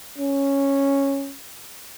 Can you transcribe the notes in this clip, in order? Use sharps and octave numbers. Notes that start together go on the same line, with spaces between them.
C#4